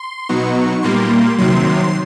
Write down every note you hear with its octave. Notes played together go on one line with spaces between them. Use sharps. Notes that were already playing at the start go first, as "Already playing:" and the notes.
Already playing: C6
B2 F#3 B3 D#4 C#6
A#2 G3 A#3 C6
C3 D#3 F#3 C6